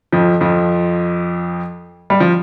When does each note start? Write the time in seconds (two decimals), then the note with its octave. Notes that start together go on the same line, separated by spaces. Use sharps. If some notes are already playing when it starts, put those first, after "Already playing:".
0.12 F2 F3
0.41 F2 F3
2.10 G3
2.20 F3